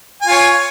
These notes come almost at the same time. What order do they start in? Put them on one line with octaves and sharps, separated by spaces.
G#5 F4 C#5